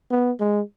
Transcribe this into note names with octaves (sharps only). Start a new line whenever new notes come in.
B3
G#3